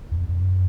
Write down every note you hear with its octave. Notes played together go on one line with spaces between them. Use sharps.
E2
F2
F2
F#2